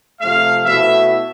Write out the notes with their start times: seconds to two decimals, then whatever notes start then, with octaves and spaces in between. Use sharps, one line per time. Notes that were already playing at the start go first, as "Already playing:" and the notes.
0.20 C3 F3 A3 F5
0.65 B2 A3 E4 E5